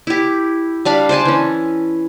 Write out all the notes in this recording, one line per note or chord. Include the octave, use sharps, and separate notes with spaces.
E4 G4
G3 D4 F5 B5
C5 D5 G#5 A5
E3 C#4